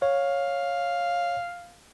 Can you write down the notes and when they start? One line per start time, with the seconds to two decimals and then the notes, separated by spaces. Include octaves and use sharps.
0.02 C#5 F5